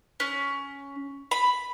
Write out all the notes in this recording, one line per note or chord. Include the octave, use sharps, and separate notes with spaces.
C#4
B5